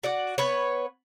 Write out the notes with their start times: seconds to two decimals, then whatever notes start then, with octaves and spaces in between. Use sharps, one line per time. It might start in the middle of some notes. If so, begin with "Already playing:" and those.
0.03 F#4 D5 F#5
0.38 B3 B4 C#5